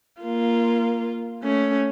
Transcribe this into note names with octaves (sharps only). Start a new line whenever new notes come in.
A#3 F4
A3 C#4